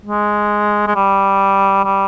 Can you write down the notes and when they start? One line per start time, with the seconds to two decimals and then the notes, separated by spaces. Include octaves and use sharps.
0.05 G#3
0.87 G#3
0.95 G3
1.84 G3